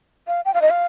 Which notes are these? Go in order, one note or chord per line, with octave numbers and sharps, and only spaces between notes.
F5
G5
F5
D#5
F5